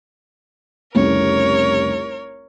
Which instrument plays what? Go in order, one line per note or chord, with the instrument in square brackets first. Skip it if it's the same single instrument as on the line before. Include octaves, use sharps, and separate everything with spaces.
[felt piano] F1 C2 C#3 [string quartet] A#4 C#5